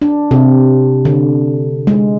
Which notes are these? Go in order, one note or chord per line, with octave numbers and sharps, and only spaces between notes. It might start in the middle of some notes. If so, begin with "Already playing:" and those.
D4
C3
D3
G#3